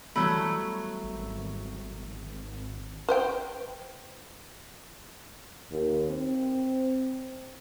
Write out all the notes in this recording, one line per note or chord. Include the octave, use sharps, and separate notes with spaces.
E3 F#3 G3 A3 B3 B5
G#1
B4 C5 G5
D#2
C4